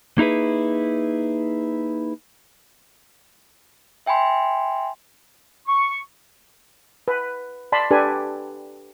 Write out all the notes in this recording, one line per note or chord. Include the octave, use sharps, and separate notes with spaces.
A#3 D#4 E4 G#4 B4
E5 G5 G#5 B5 C6
C#6
B4
D5 A5 B5 C6
D4 G4 A4 B4 D5 G#5